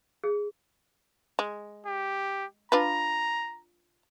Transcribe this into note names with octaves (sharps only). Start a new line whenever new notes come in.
G#4
G#3
G4
D4 F4 B4 A#5